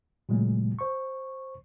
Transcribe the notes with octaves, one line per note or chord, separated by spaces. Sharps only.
A#2 C#3 F#3 G#3 A3
C5 C#6